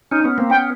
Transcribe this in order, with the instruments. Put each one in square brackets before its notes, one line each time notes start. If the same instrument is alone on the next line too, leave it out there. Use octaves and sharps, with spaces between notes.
[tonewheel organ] C#4 D#4
B3 C#4
A#3 C4
[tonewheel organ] B3 C#4 [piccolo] G5